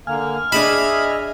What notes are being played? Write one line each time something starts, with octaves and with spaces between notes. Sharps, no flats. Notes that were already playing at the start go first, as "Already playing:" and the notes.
D3 A#3 G#5 F6
D4 G#4 D#5 E5 A5 B5